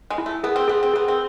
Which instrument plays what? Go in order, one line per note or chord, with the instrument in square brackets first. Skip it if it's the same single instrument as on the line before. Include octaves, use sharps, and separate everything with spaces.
[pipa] G#3
[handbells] E4
[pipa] A3
[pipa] B3 [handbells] G#4
[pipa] C4
[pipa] B3 [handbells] G#4
[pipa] C4
[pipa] B3 [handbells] G#4
[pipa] C4